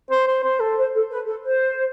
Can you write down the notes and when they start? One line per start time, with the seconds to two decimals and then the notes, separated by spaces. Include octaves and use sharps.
0.11 C5
0.27 C5
0.44 C5
0.60 A4
0.77 C5
0.94 A4
1.11 B4
1.26 A4
1.43 C5